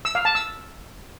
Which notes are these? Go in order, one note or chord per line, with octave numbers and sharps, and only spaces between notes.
E6
F5
A5
E6